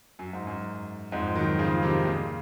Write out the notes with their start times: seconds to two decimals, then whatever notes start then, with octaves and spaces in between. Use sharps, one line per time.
0.19 F#2
0.33 G#2
0.47 F#2
1.12 F2 G#2
1.35 D#3 F#3
1.59 C#3 F3
1.83 C3 D#3
2.05 A#2 C#3